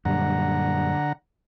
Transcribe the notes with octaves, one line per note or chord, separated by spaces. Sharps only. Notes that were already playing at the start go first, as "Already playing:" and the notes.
F#2 A#2 D3 G3 F#5 A#5